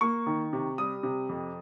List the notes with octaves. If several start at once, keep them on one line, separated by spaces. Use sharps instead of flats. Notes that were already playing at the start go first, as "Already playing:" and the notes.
A#3 C#6
D#3
C3
G3 D#6
C3
F2